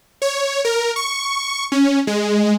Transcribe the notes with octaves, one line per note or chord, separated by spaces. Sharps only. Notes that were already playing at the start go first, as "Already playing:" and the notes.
C#5
A#4
C#6
C#4
G#3